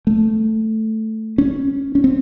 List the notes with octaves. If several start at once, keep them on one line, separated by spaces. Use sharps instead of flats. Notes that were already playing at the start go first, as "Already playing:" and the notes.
A3
C#4
C#4
C4